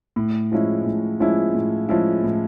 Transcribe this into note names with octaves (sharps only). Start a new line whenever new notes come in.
A2
F3 G#3 C#4 E4
A2
F3 G#3 C#4 E4
A2
F3 G#3 C#4 E4
A2